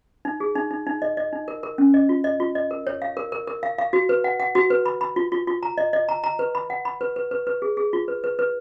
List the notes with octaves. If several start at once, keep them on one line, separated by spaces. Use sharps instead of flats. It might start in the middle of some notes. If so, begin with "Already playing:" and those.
D#4
G#4
D#4
D#4
D#4
D#5
D#5
D#4
A#4
A#4
C#4
D#5
F4
D#5
F4
D#5
A#4
C#5
F5
A#4
A#4
A#4
F5
F5
F#4
B4
F#5
F#5
F#4
B4
B5
B5
F4
F4
F4
A#5
D#5
D#5
A#5
A#5
B4
B5
F#5
B5
B4
B4
B4
B4
G#4
G#4
F4
B4
B4
B4